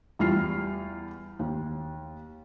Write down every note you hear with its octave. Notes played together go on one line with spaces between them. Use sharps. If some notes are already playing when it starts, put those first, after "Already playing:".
E2 G3 F4 F6 C7
D#2